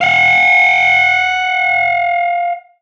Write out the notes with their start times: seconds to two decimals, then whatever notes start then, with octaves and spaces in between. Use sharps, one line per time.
0.01 F5 F#5